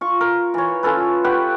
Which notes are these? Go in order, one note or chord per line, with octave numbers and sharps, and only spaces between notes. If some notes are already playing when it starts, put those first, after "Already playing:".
F4 C#6
A#4
E3 C#5
C#4 F4 A4 B4
G4 B4 F#5 G5